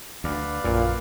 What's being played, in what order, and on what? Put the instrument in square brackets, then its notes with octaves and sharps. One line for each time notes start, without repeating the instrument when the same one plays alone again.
[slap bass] D2 [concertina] B4 D5 F5
[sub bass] A#1 [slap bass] F#2 [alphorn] A#2